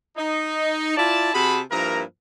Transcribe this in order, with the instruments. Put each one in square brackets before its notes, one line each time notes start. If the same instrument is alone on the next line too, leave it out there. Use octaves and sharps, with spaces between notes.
[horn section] D#4
E4 F4 D5 A5
C3 F#4 G#4 A5 B5
G2 F3 A#3 E4 A#4 A#5